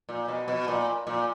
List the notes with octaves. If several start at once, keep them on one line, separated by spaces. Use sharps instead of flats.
A#2
B2
B2
A#2
A#2